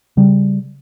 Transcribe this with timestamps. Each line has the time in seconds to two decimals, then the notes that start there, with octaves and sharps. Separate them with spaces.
0.17 C#3 G3